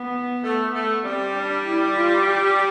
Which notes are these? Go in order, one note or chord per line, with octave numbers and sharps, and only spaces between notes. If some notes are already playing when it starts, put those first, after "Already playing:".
Already playing: B3
A3
A3
G3 C4
D4
E4
F4
G4